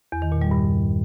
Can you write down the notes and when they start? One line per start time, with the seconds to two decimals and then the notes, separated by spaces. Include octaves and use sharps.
0.12 E2
0.22 D#3
0.32 A#2
0.42 G3
0.51 G2